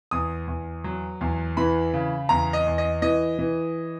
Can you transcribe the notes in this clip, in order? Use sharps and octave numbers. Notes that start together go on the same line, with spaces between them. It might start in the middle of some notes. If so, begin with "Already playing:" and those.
E2 D#6
E2
F#3
E2
E3 B5
C#3
E2 A#5
D#5
E2
D#5
E3 D#5
E3